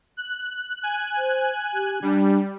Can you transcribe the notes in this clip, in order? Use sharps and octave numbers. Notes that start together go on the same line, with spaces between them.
F#6
G#5 F#6
C5
G4
G3 D4